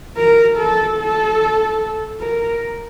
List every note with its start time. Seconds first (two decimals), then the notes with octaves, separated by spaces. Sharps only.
0.17 A#4
0.58 A4
0.98 A4
2.20 A#4